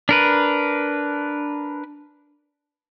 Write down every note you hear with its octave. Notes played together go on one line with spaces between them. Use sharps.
D4 A#4 B4